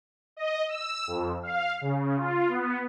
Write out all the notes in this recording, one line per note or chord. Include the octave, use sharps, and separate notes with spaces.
D#5
E6
F2
F5
C#3
F4
B3